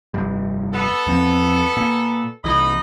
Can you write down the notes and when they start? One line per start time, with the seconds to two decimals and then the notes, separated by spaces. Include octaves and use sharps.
0.14 F1 G2 G3
0.73 B3 A4
1.07 E2 F3 C4
1.77 A#2
2.44 C2 E3 D#4 D#5 B5